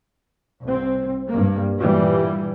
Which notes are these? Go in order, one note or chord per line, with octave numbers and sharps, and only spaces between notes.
C2 C4
G2 A#3
G2 A#2 E3 G3